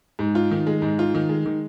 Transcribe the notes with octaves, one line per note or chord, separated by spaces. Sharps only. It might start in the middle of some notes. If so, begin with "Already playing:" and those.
G#2
F4
D#3
G#3
G#2
F4
D#3
G#3
D#3